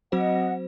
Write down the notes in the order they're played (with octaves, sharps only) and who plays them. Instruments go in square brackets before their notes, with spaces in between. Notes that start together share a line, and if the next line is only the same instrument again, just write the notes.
[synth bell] F#3 C4 F#4 C5 [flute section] D#5 F#5